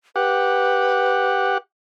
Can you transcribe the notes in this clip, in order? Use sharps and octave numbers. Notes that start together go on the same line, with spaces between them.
G4 B4 F#5